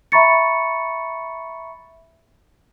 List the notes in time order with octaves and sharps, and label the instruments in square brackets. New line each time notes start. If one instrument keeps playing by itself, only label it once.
[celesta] E5 A#5 B5 C#6 A6 C#7